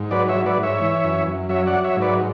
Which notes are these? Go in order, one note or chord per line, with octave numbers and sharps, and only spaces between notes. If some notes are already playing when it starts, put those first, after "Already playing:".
Already playing: G#2
F#3 B4 D5
C#5 E5
F#3
B4 D5
G#2
C#5 E5
E3
F#2
F#2
F#3 C#5 E5
D5 F#5
F#3
C#5 E5
G#2
B4 D5